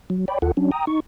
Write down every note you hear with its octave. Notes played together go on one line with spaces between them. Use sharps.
F#3
C#5 D5 G5 B5
D#2 F4 A4 F#5
F#3 C#4 D4
G5 A#5 D#6
D#4 C#6